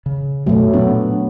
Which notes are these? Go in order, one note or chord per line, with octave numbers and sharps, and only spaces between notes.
C#3
F#2 B2 F#3 A3
A#2 F#3 B3 D4